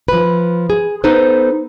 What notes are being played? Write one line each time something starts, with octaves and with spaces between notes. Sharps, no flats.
F3 B4
G#4
B3 D#4 A4 B4 C5